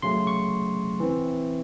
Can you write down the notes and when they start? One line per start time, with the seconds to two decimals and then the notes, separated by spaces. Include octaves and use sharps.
0.02 C#3 F#3 A3 C#4 C6
0.27 C#6
1.00 E3 C4